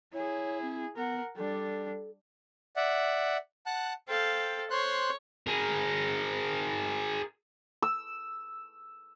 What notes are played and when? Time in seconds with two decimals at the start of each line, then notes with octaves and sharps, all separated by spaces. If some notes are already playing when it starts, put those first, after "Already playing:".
0.14 E4 G#4 C#5
0.62 C4
0.96 B3 A#4 F#5
1.37 G3 D4 A4
2.76 D5 E5 F#5
3.66 F#5 A5 F#6
4.08 A4 C5 F5 G5
4.71 C5 C#5 C6 F#6
5.47 G#4 A#4
7.82 E6